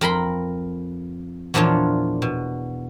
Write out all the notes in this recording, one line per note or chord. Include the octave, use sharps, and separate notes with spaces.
F2 A#4 B5 C6
E2 A#2 F3 D4 F4 C#5
B2